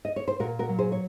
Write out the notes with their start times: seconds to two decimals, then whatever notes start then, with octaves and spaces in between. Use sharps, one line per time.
0.05 D#5
0.16 C#5
0.28 C5
0.40 A#2 F#4 A#4
0.59 F#4 A#4
0.69 F#3
0.78 G#4 C5
0.92 C#5